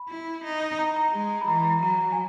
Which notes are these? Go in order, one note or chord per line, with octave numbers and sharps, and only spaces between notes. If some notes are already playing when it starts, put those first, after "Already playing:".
Already playing: B5
E4
D#4
A#5
A#5
G#3
B5
E3 A#5
A#5
F#3 A#5
G#5